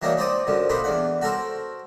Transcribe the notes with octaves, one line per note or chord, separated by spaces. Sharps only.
E3 F#3 A#3 D4 D#4
C4 D#4 C5 D5 D#6
F#2 D3 F3
A#2 D4 D#4 B4 C5
E2 D4 F#5
F#4 A4 A#4 C5